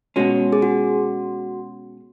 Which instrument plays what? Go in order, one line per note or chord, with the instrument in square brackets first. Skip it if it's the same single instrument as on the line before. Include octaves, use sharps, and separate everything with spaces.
[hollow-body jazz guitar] B2 G#3 C#4 [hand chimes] F#4
[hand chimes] G#4
F#4